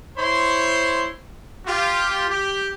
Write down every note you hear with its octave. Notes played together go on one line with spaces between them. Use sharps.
E4 C5 C#5 C6
F4 G4
G4